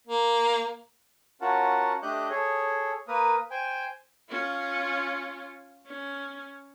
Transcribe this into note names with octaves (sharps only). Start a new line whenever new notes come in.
A#3
C#4 F4 F#4 A#4 F#5 A5
A3 D4 G4 D#5 F#6 G6
G#4 A4 C#5
A#3 A#4 B4 D#6
C5 G5 G#5
C#4 F4
C#4